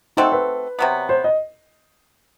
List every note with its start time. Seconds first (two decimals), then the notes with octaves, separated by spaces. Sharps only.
0.17 A3 C4 D#4 F#4 A4
0.32 B4
0.79 C3 F#3 B3
1.09 C5
1.24 D#5